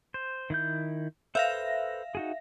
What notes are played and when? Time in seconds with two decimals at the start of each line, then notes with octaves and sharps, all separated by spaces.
0.14 C5
0.50 D#3 E4 G6
1.35 A4 B4 C5 E5 F5 A#6
2.15 D#4 F#4 G#4